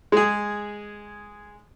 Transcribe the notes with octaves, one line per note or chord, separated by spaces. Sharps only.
G#3 G#4